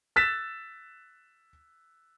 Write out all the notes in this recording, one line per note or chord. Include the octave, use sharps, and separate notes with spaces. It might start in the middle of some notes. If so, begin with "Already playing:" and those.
E6 F#6 A6 B6 E7